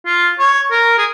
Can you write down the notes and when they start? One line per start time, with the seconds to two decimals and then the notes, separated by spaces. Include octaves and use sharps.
0.06 F4
0.39 C#5
0.71 A#4
0.98 G#4